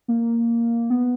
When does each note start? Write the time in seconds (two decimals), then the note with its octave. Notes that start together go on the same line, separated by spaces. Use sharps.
0.08 A#3
0.90 B3